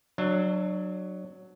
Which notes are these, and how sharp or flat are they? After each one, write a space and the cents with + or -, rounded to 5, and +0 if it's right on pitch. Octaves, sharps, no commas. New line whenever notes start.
F#3 +0 D4 +25 E5 +20